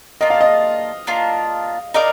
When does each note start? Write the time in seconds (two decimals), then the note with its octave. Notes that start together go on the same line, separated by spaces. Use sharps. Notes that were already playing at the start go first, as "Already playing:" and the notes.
0.21 A#3 D4 F4 D#5
0.30 F5
0.41 D#5
1.07 A#3 D4 F4
1.94 D#4 A#4 D5 D#5 F5